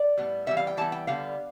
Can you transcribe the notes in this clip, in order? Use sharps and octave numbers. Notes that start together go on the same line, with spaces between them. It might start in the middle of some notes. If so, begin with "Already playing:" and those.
Already playing: D5
A2 G3 B3
E3 G3 B3 E5
F5
G5
E3 G3 B3 A5
G5
D3 G3 B3 F5